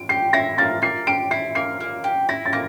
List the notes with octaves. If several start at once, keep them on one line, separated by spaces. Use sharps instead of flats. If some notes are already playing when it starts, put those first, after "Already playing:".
Already playing: D7
G4 C7
E4 A#6
A#3 A6
A#3 C7
G4 D7
E4 C7
A#3 C7
A#3
G4
E4 A#6
A6
A#3 A#6